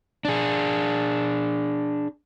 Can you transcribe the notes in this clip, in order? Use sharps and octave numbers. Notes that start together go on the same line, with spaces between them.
D4 G#4